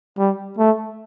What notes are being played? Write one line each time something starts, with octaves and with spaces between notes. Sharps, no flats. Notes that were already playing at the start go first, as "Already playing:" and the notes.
G3
A3